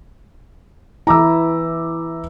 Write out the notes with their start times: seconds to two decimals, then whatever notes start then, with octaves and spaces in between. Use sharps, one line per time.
1.07 E3 E4 A#5 D6 E6